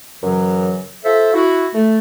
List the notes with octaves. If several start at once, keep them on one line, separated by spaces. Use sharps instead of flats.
F#2 C#3 E3 F#3
F4 A4 C5 E5
E4 F#4
A3